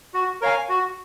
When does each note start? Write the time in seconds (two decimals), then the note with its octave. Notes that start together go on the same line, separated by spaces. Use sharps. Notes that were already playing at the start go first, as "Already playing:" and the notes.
0.14 F#4
0.41 A#4 C#5 F5 G#5
0.69 F#4